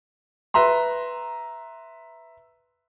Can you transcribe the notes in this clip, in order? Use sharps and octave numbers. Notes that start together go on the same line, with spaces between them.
B4 E5 A#5 C6